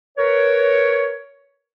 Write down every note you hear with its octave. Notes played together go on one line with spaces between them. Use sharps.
A#4 B4 C#5